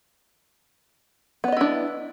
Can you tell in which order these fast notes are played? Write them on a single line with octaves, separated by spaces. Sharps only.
B3 D5 D#5 E4 D4